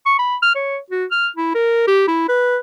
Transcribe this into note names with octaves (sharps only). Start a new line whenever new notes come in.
C#6
B5
F6
C#5
F#4
F6
E4
A#4
G4
E4
B4